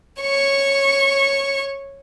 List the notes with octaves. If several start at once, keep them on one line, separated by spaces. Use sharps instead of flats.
C#5 C#6